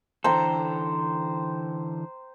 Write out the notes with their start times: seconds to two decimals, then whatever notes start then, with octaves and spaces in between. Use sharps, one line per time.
0.24 D3 E3 A4 C5 G5 A#5